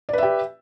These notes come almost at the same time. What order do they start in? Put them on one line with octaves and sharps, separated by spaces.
D5 B4 E5 G4